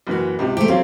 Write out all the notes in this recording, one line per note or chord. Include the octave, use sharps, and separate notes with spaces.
F#1 E3 F#4
C#2 C3
A3 G4 C5
F#3 C4 C#4 F4